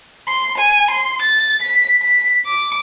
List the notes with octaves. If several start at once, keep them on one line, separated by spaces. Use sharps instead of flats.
C6
G#5
C6
A6
B6
B6
D6